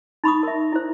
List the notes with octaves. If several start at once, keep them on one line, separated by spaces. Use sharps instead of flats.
D#4 B5 C#6 D#6
A#4 E5
E4 C5